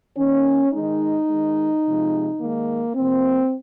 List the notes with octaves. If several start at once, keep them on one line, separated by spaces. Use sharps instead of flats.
D#3 A#3 C#4
D#3 G#3 D#4
D#3 G#3
C3 F3 G#3
D#3 G#3 A#3
C3 F3 A#3 C4